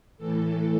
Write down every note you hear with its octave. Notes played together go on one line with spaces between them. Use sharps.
A2 E3 A4